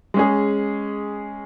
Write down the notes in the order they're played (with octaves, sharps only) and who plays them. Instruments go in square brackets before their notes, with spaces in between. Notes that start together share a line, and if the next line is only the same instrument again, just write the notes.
[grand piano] G#3 C#4 G#4